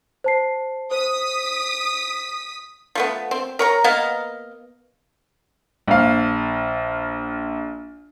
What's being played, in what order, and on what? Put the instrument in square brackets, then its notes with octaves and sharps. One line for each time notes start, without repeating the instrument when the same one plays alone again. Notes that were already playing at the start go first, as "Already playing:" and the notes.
[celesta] C5 A5 C7
[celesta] C5 [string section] D#6 B6
[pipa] F3 A3 B3
C4
A#4 C#5 A#5
A#3 B3 D#5 F5
[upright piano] A#1 F5